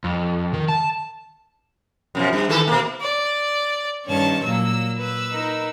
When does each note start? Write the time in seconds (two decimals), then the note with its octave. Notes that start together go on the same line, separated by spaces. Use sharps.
0.04 F2
0.54 D#3
0.69 A5
2.15 F#2 B2 F3
2.33 G2
2.49 D#3 E3 A4
2.68 B2 A#3
3.01 D5
4.05 G2 D#3 C#4 C#5 A5
4.44 A#2 F#3 A#3 E6
4.98 B4 E6
5.31 D#4 A#4